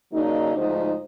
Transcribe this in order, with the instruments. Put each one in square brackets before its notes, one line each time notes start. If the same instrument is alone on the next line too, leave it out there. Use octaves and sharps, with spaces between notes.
[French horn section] C#3 F#3 A#3 D4 D#4
D2 G#2 F3 D#4 C5